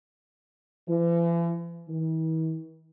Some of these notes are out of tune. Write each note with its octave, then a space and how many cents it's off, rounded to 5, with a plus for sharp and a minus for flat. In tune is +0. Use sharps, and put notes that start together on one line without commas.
E3 +45
E3 -45